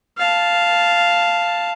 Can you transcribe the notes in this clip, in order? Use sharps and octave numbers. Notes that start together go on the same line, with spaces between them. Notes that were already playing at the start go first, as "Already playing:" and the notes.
F5 A5